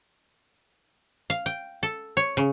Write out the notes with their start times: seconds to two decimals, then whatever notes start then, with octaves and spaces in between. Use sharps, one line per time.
1.30 F5
1.46 G5
1.83 A4
2.17 C#5
2.37 C#3